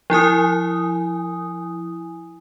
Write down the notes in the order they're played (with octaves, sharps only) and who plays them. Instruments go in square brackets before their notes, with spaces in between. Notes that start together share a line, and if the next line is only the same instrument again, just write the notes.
[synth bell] F3 E4 G#5 D#6